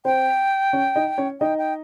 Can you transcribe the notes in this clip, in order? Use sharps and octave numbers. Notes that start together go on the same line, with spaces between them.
C4 C5 G5
C#4 C#5
D#4 D#5
C#4 C#5
D#4 D#5 G5
G5